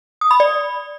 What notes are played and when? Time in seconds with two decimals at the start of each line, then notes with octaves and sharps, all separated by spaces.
0.21 D#6
0.31 B5
0.40 D5